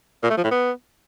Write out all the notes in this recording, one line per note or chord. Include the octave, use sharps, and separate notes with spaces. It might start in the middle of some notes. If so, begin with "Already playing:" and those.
A#2
A3
F3
A2
B3